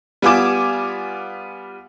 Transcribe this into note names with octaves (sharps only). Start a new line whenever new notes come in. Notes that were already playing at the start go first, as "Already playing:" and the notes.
G3 B3 F4 G#5 D6 E7